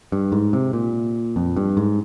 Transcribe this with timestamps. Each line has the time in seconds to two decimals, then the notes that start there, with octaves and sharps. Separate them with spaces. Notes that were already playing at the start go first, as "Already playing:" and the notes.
0.12 G2
0.32 G#2
0.53 C3
0.73 A#2
1.36 F2
1.56 G2
1.77 G#2